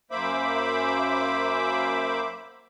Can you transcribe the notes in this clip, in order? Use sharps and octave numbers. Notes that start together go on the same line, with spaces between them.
F#2 A#3 C5 E5 B5 D6